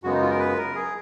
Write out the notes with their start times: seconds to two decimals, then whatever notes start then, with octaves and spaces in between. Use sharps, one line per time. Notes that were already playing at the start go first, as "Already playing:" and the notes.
0.04 F#2 C#3 G#3 B3 F#4
0.12 D#4
0.21 F4
0.30 A#4
0.39 B4
0.57 A#4
0.75 G#4